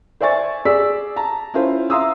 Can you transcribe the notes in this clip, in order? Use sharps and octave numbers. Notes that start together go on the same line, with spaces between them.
C5 D5 E5 G#5 C#6 A6
G#4 D5 E6 B6
A5 A#5
C#4 E4 F4 C5
E5 F5 A#5 C6 D#6 E6